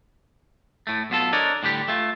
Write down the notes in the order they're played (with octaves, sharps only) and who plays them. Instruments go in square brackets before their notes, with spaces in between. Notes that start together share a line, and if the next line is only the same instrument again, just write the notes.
[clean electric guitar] A2 A3
B1 B2 F4 A4
D4 A4 A#4 C#5 D#5
A2 D3 G3 G4
A3 F4